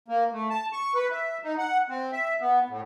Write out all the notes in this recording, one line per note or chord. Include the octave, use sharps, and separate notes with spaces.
A#3
A3
A5
C#6
B4
E5
D#4
F#5
C4
E5
B3
A2